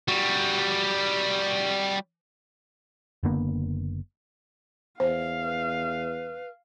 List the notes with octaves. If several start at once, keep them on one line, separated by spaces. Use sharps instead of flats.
G3 F#4
F#1 D3 A#3 B3
E2 C5 F5
B4